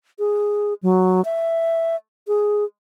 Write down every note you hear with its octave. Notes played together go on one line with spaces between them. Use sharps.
G#4
F#3
E5
G#4